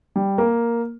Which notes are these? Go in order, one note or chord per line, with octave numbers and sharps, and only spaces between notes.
G3
A#3 A#4